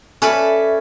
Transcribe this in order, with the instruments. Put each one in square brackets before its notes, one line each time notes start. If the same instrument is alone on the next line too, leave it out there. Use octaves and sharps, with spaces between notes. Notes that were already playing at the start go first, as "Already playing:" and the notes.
[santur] C#4 [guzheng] A4 B4 D5 [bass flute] E5